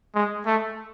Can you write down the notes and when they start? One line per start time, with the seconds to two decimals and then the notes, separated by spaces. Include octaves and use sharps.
0.15 G#3
0.46 A3